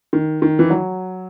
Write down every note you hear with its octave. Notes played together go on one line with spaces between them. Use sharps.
D#3
D#3
E3
F#3